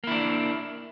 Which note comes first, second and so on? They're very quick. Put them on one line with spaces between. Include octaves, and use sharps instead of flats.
A#3 E4 D4